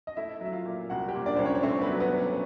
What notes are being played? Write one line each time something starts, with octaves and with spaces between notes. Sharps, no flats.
D#5
A3 E4 E5
F#3 E5
F4 F5
A#2
C2 F#4 F#5
G4 G5
A#2
D4 D5
C2 C5
C#4 C#5
C#5
A3 C4 C5
B3 B4
F#3
B3 B4
A3
C#4 C#5